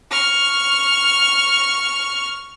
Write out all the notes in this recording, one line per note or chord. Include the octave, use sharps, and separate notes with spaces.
C#6 F6